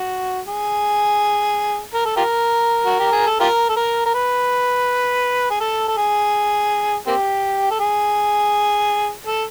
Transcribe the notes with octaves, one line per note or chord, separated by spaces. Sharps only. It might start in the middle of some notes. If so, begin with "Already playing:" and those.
Already playing: F#4
G#4
A#4
A4
F4 G4 A#4
F#4
G4
G#4
A4
F4 G4 A#4
A4
A#4
A#4
B4
G#4
A4
A4
G#4
A#3 C4 G4
A4
G#4
A4